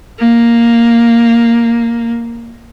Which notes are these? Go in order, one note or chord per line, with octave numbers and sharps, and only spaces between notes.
A#3